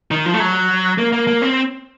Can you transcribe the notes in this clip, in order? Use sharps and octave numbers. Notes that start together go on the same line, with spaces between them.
D#3
F3
A3
F#3
A#3
A#3
A#3
C4